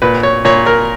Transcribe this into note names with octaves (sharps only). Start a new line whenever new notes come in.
A#2 B4
C#5
A#2 C#5
A#4